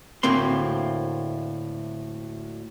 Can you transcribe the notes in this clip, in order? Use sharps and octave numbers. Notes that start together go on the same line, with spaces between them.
D2 A2 A#3 C4 C6